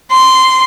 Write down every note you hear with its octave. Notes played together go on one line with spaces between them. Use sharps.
C6